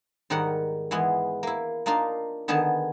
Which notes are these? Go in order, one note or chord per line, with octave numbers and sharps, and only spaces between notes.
G#2 D#3 G3 A#4 F#5
E3 G#3 B3
A#3 E4
A#3 D4 D#4 F4 A#4
D3 D#3 B3 G#4 A5